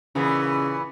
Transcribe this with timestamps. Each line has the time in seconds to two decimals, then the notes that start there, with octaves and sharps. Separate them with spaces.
0.15 A#2 C#3 E3 B3